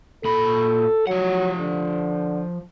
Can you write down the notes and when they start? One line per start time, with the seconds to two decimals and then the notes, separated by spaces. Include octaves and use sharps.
0.25 A#2 A4 B5
1.07 F3 F#3 F#5
1.59 D3